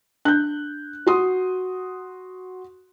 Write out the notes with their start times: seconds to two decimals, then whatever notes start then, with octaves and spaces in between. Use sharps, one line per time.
0.25 D4 F#6 G6
1.06 F#4 C6 D#6